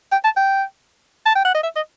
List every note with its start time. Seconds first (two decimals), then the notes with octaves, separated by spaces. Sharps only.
0.12 G5
0.24 A5
0.37 G5
1.26 A5
1.36 G5
1.45 F#5
1.55 D#5
1.64 E5
1.76 D#5